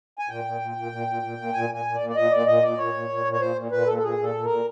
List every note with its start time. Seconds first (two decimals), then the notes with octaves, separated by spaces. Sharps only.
0.19 G#5
0.29 A#2 G5
0.45 A#2
0.61 A#2
0.76 A#2
0.92 A#2
1.07 A#2
1.23 A#2
1.38 A#2
1.54 A#2 G#5
1.69 A#2 G#5
1.85 A#2
1.95 D5
2.00 A#2
2.09 D5
2.16 A#2 D#5
2.31 A#2 D5
2.47 A#2 D#5
2.63 A#2 D5
2.78 A#2 C#5
2.94 A#2
3.09 A#2
3.25 A#2
3.32 C#5
3.40 A#2 C5
3.56 A#2
3.71 A#2 B4
3.87 A#2 A4
3.97 A4
4.03 A#2 G#4
4.18 A#2
4.23 A4
4.34 A#2
4.44 A#4
4.50 A#2